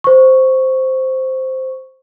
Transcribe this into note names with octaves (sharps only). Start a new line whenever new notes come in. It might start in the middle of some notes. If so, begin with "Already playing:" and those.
C5 C#6